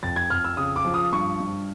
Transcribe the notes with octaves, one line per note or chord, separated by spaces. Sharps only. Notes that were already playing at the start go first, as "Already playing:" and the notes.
F2 A6
G#6
F2 F6
E6
C#3 D#6
D6
F3
D#6
G2 C#6
G2